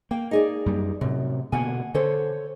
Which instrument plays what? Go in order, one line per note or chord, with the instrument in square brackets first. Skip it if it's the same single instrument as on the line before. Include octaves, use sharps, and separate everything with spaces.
[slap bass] A#3 [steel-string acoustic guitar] G5
[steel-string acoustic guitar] D#4 G#4 D5
[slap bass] F#2 G3
[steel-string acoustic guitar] F#2 [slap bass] A2 C3
[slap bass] B2 D3 A#3 [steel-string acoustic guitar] F#5 G#5
[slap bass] D3 [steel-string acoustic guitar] A4 C5 C#5